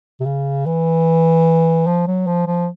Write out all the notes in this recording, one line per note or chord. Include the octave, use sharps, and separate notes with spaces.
C3
C#3
E3
F3
F#3
F3
F3